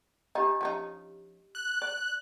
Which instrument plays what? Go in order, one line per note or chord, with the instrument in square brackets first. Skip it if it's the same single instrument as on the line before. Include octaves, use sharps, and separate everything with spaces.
[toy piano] D4 G4 D#5 [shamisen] D#4
[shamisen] F3 C#4 D#4
[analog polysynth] F#6
[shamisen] D5